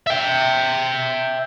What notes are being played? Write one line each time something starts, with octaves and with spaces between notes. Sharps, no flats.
E5 G5